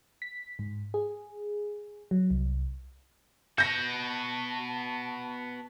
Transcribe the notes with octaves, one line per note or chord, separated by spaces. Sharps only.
B6
G#2
G#4
F#3
C2
B3 F#4 A5 G6 A#6